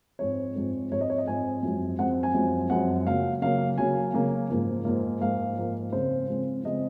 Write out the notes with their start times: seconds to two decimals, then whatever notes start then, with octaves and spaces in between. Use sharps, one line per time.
0.19 G#2 F3 G#3 C4 C#5
0.55 G#2 F3 G#3 C4
0.91 G#2 F3 G#3 C4 C#5
1.01 D#5
1.10 C#5
1.18 D#5
1.27 G#2 F3 G#3 C4 G#5
1.63 F#2 F3 G#3 C4
1.99 F#2 F3 G#3 C4 F#5
2.23 G#5
2.34 F#2 F3 G#3 C4
2.70 F#2 F3 G#3 C4 F#5
3.06 C#3 F#3 A#3 F5
3.42 C#3 F#3 A#3 F5
3.77 C#3 F#3 A#3 G#5
4.14 C#3 F#3 A#3
4.50 G#2 F3 A#3
4.85 G#2 F3 A#3
5.21 G#2 F3 A#3 F5
5.57 G#2 F3 A#3
5.92 C#3 F3 G#3 C4 C5
6.28 C#3 F3 G#3 C4
6.64 C#3 F3 G#3 C4 D#5